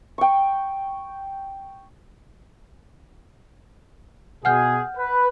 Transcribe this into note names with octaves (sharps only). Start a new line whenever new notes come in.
G5 C#6
B2 G#4 F#5 F6 G6
B4